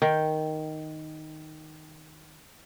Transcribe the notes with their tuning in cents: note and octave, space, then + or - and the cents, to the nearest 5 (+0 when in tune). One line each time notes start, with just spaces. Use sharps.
D#3 +0 G5 +0